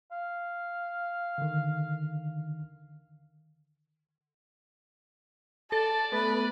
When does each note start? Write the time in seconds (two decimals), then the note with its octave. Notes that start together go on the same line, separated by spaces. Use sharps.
0.12 F5
1.38 D3 D#3
5.72 A4 D5 A5
6.12 A3 B3 B4